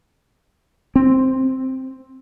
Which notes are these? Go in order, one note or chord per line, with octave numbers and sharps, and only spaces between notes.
C4